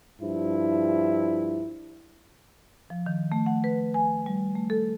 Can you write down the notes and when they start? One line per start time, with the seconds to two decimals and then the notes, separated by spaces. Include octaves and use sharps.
0.22 G2 F3 E4
2.90 F3
3.06 D#3
3.32 A3
3.46 F#5
3.64 B4
3.94 G#5
4.26 G3
4.55 A3
4.70 A4